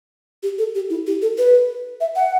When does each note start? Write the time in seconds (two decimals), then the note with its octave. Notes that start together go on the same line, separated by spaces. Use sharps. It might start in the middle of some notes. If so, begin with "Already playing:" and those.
0.43 G4
0.58 A4
0.75 G4
0.90 E4
1.07 G4
1.22 A4
1.38 B4
2.01 E5
2.16 F#5